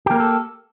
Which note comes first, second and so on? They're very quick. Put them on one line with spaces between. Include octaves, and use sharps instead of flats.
G4 A#3 A#4 A4